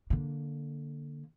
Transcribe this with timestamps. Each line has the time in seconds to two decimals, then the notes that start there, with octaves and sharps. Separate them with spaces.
0.10 D3 A#3